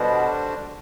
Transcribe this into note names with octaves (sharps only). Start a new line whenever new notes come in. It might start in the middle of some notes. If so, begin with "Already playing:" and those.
Already playing: B2 D3 G3 D4 F#4 C5